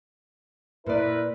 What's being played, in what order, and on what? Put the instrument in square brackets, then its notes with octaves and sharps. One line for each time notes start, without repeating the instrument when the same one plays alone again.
[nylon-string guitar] A#2 D5 [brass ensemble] E4 A#4 B4